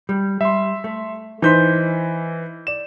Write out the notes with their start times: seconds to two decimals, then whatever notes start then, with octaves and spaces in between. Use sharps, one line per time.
0.09 G3
0.41 G3 E5 C6
0.84 A3
1.42 E3 D#4 B4 C5 G6 B6
2.67 D5 E7